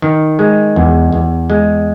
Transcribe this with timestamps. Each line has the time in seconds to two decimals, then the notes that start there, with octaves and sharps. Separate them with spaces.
0.02 D#3
0.39 G#3
0.76 E2
1.12 E2
1.50 G#3